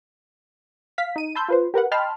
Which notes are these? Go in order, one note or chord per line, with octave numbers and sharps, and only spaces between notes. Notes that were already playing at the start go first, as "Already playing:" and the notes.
F5 B6
D#4 D#7
A5 B5 C6 E6 G6
F4 B4 C5
G4 A#4 B4 F#5
D#5 G5 A5 B5 C6 F6